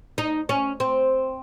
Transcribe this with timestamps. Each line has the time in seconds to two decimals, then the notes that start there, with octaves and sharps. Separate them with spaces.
0.18 D#4
0.49 C#4
0.80 C4